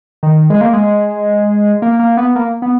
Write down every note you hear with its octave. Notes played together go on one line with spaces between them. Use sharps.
D#3
G#3
A#3
G#3
A#3
A#3
B3
A#3
B3